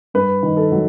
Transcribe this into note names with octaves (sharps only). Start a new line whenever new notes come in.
G2 B4
D#3
A4
F#3